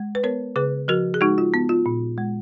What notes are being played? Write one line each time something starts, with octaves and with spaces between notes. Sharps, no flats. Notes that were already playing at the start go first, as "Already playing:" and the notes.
Already playing: G#3
B4
B3 A#4 C#5
C#3 G#4 B4
F3 F#4 A#4
G#4
G#3 D#4 F#4
F4
B3
F4
A#2
G#3